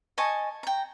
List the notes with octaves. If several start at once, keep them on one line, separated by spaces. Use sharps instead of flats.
D#5 G#5 A5 C#6
G5 A#5